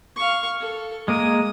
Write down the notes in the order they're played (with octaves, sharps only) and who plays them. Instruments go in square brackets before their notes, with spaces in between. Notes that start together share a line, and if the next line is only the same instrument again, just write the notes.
[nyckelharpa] F5 C#6
A4
[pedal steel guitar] G#3 A#3 A#4 [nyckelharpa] D#6